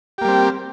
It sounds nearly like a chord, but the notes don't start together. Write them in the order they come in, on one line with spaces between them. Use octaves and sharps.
G4 A#3 G3 C4